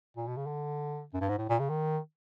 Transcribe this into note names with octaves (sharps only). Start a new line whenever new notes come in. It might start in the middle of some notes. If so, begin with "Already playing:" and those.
A#2
B2
C#3
D3
F#2
G2
G#2
A2
A#2
C#3
D#3